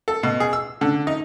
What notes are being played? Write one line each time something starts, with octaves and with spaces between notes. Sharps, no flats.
A4
B2
G#4
E6
D3
D#4